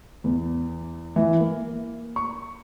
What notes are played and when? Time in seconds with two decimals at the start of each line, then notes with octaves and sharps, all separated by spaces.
0.24 E2
1.16 E3
1.40 A#3
2.16 C#6